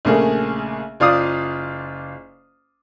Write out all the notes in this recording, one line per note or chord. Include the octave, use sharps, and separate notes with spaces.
A#1 C#3 A3 A#3 G#4
F#1 F4 D5 F5 D#6